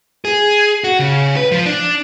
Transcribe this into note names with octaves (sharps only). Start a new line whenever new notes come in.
G#4
F#4
C#3
B4
F3
D4